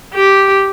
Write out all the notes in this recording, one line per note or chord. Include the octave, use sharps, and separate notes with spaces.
G4